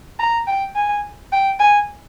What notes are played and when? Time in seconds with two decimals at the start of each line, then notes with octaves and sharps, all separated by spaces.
0.20 A#5
0.48 G5
0.76 G#5
1.32 G5
1.60 G#5